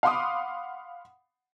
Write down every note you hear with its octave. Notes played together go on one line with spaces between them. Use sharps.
F5 F#5 B5 C6 D6 D#6